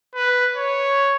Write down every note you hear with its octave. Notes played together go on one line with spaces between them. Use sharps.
B4
C#5